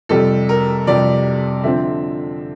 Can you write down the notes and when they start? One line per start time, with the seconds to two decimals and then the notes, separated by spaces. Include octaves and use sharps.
0.09 F2 C3 G3 A4
0.49 A#4
0.87 F2 C3 G3 D5
1.64 D3 F3 C4 E5